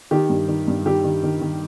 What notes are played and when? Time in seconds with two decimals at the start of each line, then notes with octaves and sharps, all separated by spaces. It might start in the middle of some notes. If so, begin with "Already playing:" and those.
0.11 D#3 G4
0.29 G2
0.48 D#3
0.68 G2
0.85 D#3 G4
1.04 D#3
1.23 D#3
1.41 D#3